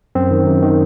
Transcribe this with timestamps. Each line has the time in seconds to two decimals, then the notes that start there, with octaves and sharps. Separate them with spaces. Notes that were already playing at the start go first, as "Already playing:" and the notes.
0.15 F#2 C4
0.31 D#3
0.47 F#2
0.62 D#3